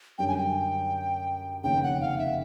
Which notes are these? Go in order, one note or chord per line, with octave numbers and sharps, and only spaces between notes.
F#2 D3 G3 G5
G#5
G5
F1 D#2 C#3 G5
F#5
F5
E5